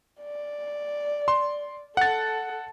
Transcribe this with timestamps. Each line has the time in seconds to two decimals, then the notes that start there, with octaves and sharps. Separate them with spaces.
0.23 D5
1.28 C6
1.97 A4 F#5 A6